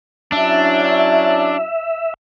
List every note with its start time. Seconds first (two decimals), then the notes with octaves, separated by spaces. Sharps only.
0.32 F#3 C#4 D4 E4 E5